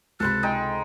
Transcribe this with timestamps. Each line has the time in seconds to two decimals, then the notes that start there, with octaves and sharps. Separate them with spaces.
0.20 C#2 C3 A4 C5 B5 F#6
0.43 G#3 D#4 G5